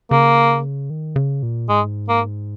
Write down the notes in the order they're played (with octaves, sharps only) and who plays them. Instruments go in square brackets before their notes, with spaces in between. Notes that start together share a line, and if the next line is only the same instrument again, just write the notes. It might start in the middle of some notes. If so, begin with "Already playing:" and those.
[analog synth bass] C#3 [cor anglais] A#3
[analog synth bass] D#3
C#3
A#2
[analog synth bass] G#2 [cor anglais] G#3
[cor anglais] A#3